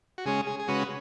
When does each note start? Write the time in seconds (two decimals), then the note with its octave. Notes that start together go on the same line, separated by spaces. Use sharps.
0.18 F#4
0.25 C#3 G#3 C#4 G#4
0.47 G#4
0.60 G#4
0.68 C#3 G#3 C#4 F#4 B4